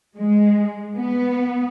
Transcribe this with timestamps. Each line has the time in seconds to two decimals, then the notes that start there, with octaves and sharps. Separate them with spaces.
0.17 G#3
0.97 B3